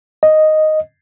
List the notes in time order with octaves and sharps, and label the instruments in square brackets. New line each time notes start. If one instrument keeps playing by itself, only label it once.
[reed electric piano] D#5